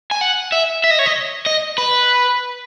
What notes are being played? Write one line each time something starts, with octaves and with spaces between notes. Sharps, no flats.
G#5
F#5
E5
E5
D#5
C#5
D#5
D#5
B4